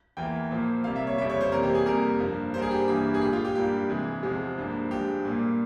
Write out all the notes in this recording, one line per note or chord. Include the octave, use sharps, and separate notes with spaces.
E2 E3 A#3 G5
A#2 F3 A#3
C3 G3 A#3 F5
E5
C#5
F2 C#3 G3 E5
C#5
C5
C3 E3 G3 A#3 A#4
G4
G#4
F2 C3 G3 A#3 A#4
G2 F3 A#3
G2 G3 A#3 A#4 C5
G#4
G4
G2 E3 G3 A#3 G4
G#4
A#2 G#3 G4
F4
G4
G2 G3 A#3 G4
C3 E3 G#3
E2 C3 F3 G#3
G2 F3 A#3
G2 F3 G#3 G4
A#2 G3 A#3